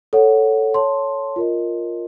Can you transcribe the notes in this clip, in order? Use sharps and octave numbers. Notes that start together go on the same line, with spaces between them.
A4 C#5 F#5
C#5 A5 C6
F4 A#4 D#5